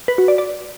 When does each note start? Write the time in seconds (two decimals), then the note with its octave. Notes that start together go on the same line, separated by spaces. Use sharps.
0.08 B4
0.18 F#4
0.28 D5
0.38 D5